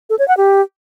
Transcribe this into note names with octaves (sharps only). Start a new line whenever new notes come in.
A4
C#5
F#5
G4